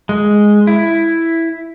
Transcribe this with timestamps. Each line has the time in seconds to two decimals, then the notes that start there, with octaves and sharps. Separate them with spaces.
0.09 G#3
0.67 E4